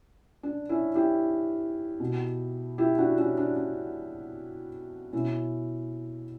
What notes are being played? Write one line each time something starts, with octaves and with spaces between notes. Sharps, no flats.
D4
C#4 E4
E4 G4
B2
E4 G4
D4 F#4
C#4 E4
D4
D4
B2 C#4 E4